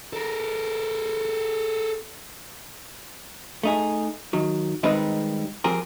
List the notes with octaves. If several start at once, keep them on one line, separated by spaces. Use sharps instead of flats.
A4 A#4
A3 D#4 G#4
D#3 F#3
D#3 G3 G#3 C4 D#4 B4
F3 C4 G4 G#4 A#4